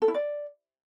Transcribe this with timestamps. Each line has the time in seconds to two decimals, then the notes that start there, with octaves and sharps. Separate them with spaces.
0.02 A4
0.08 E4
0.14 D5